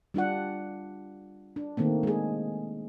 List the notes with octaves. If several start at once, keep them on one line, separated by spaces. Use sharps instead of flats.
G3 D4 F4 F#5
D4
D#3 A3 A#3 C4
G#3 G#4